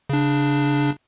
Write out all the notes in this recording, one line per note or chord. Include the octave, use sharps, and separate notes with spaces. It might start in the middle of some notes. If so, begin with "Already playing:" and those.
C#3 D4